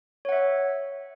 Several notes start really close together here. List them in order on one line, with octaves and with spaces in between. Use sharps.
C#5 F#5 E5